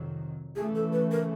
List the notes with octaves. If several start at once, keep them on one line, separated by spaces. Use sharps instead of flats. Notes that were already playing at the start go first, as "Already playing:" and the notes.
Already playing: F2 C3 D#3 F#3
C#3 E3 A3 G#4
A4
B4
A#4